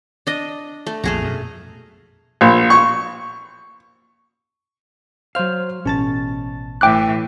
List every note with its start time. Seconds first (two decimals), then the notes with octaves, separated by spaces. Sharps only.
0.27 D4 D#5
0.87 A3
1.04 A#1 F2 A3 G#4 A#5
1.22 F#2 B2
2.41 A#1
2.70 C#6
5.35 F#3 C5 F5 F6
5.85 A1 B2 C#4 A5 A6
6.81 A2 E3 G5 D6 F#6